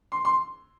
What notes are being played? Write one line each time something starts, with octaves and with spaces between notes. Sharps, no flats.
C6
C6